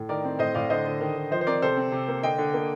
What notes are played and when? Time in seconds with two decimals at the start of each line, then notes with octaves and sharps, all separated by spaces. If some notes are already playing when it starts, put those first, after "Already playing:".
Already playing: A2
0.09 D#3 A#4 D5
0.24 C4
0.39 A2 C5 D#5
0.55 A2 D5 F5
0.70 D3 C5 D#5
0.86 D3
1.01 D#3
1.16 D#3
1.31 F3 C5 D#5
1.41 C5
1.47 C4 A#4 D5
1.62 C3 A4 C5
1.77 C4
1.92 C3
2.08 A#3
2.23 D3 D#5 G5
2.38 D3
2.54 A#3